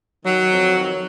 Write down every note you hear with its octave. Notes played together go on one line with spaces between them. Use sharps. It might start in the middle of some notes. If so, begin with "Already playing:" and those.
D#3 F#3
F2
D#3